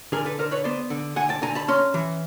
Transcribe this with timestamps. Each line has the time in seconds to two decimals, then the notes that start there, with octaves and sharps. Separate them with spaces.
0.12 D3 G#4 A#4
0.25 A4 B4
0.38 D3 A#4 C5
0.51 B4 C#5
0.64 B3 C5 D5
0.90 D3
1.16 D3 F#5 G#5
1.29 G5 A5
1.42 D3 G#5 A#5
1.55 A5 B5
1.68 C#4 A#5 C6
1.94 E3